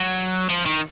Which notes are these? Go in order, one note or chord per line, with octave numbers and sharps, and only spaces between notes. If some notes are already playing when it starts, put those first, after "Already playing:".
Already playing: F#3
F3
D#3